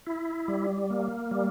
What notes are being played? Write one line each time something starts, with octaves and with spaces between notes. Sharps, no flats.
E4
G3
A#3
G3